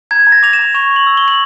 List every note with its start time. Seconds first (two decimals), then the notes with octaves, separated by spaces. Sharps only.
0.11 A#5 G#6
0.27 A#5
0.32 A#6
0.43 D6 F7
0.53 E7
0.59 A#5
0.74 C#6 F7
0.91 C#6
0.96 F#7
1.07 E6
1.17 G7
1.23 C#6
1.28 F#7